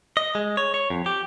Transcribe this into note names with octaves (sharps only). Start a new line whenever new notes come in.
D#5
G#3
C#5
C#5
F2
G4